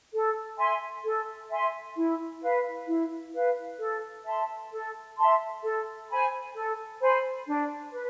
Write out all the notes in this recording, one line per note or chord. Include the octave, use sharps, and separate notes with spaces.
A4
E5 G#5 C6
A4
E5 G#5 C6
E4
B4 F5
E4
B4 F5
A4
E5 A5 C6
A4
E5 A5 C6
A4
C5 G#5 B5
A4
C5 G#5 B5
D4
B4